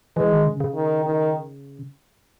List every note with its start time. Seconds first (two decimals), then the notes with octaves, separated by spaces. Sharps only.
0.17 E3 G#3
0.32 D#3
0.46 C#3
0.60 C#3
0.75 D#3
1.05 D#3